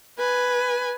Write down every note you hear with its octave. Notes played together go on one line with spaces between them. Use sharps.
B4 G#5